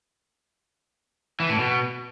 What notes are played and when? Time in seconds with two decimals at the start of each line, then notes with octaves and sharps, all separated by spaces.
1.40 E3
1.49 A2
1.59 B2